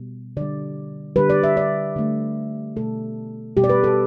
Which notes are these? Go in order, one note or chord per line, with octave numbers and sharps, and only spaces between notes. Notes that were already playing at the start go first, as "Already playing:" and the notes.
Already playing: B2 G3
D3 G3 D5
D3 G3 B4
D5
E5
D5
D3 A3
B2 A3 A4
B2 G3 G4
D5
B4
A4